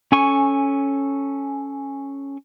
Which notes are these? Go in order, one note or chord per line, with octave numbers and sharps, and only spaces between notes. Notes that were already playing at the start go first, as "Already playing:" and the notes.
C#4 A4 G#5 C#6